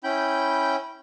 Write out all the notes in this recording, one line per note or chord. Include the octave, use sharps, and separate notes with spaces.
C#4 E4 G5 B5 G6